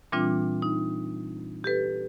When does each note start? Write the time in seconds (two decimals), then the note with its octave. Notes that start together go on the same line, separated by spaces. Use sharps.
0.12 A#2 E3 G3 C4 D4 F4
0.62 D#4
1.64 G4 A4 B4